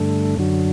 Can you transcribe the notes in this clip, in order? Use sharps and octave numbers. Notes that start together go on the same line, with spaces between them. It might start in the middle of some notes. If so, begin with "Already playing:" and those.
Already playing: G2 D3 A3
F#2 D3 F#3